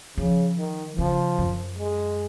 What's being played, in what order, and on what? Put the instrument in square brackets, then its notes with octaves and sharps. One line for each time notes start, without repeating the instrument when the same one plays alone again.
[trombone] C#3 [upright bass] F3
[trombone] D#3
[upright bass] C#3 [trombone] F3
[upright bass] F#2
[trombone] G#3